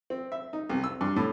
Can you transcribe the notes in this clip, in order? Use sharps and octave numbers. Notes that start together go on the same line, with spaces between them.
C4
E5
D#4
C2
E6
G2
A2